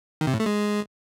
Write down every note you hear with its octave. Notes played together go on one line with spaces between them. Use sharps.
D#3
C3
A2
A3
G#3